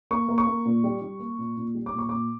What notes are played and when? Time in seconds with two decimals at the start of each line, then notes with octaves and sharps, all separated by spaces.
0.11 A#3 C#6
0.29 A#3
0.38 C#6
0.47 A#3
0.65 A#2
0.84 G3
1.02 G3
1.20 A#3
1.38 A#2
1.57 A#2
1.75 G3
1.86 D6
1.93 A#2
1.98 C#6
2.09 A#2 D6